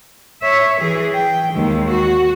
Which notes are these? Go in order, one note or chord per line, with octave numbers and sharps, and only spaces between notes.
C#5 E5
E3 G#4
G5
D#2 G#3
F#4